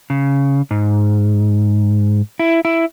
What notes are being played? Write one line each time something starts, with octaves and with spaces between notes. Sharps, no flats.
C#3
G#2
E4
E4